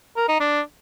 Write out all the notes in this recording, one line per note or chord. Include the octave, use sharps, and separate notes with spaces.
A#4
D#4
D4